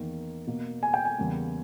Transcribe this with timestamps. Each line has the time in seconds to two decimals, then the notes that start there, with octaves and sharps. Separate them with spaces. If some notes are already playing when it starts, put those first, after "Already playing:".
Already playing: E2 D#3 A#3
0.47 B2 A#3
0.83 G#5
0.94 G5
1.05 G#5
1.18 E2 C#3 G3 A#3